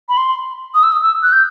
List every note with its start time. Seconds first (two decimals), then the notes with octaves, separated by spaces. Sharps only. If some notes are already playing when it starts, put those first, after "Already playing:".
0.09 B5
0.17 C6
0.75 D#6
0.83 E6
0.92 D#6
1.03 E6
1.23 F#6
1.32 G6